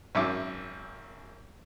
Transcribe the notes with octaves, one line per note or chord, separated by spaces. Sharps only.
G#1 F#2 E5 D6